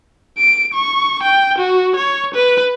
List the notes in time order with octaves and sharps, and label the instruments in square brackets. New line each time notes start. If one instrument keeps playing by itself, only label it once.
[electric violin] D7
C#6
G5
F#4
C#5
B4